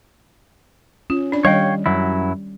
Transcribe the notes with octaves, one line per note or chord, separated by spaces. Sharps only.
C#4 F4
D4 D5
D#3 G3 C#5 D#5 F5 G5
F#2 F#3 E4